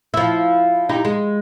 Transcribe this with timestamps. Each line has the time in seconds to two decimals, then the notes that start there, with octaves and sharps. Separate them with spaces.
0.14 F3 E4
0.89 D#4 E4 G4
1.05 G#3